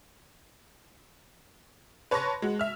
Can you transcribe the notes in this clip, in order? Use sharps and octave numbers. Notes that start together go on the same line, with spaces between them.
B4 C#5 A5 C6 C#6 A#6
G#3 F#4
E5 F6